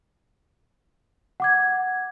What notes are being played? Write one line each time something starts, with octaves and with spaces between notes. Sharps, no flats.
F#5 D6 G#6